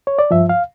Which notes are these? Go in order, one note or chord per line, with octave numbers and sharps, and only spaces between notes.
C#5
D5
G2 F3 E5
F5